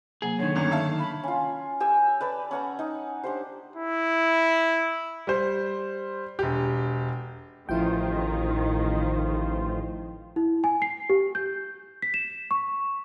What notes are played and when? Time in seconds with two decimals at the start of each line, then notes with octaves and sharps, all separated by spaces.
0.22 C3 F#3 A#3 G#4
0.39 D3 D#3 C#5
0.55 G1 C#4
0.71 E5 F5 A5
0.99 B5
1.24 C#4 F4
1.80 G4 G#5 E6
2.21 B4 D5 A5
2.51 C#4 F#5 A#5
2.79 D#4
3.24 D4 G4 C5
3.76 E4
5.27 G3 C5
6.39 E1 G4
7.69 A1 D#3 F3 E4 F4 C5 G5
10.36 E4
10.64 G#5
10.82 C7
11.09 G4
11.35 G6
12.02 B6
12.14 E7
12.51 C#6